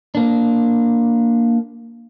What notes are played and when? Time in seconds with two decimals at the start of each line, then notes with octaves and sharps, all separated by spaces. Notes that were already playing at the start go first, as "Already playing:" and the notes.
0.15 A#3 D4